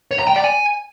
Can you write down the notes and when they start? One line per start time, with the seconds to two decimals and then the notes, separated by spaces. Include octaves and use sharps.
0.11 C#5
0.19 A#5
0.27 G5
0.36 D5
0.44 G#5